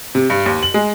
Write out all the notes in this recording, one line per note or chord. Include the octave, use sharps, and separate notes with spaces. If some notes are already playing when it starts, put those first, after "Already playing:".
C3
G2
D#2
F#7
G#3